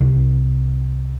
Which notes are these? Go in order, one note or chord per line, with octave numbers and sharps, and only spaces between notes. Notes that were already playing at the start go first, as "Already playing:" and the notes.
C2